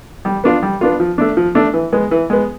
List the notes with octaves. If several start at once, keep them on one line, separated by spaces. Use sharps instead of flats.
G3
B3 D4 F4
G3
B3 D4 F4
F3
A3 D4
F3
A3 D4
E3
G#3 B3
E3
G#3 B3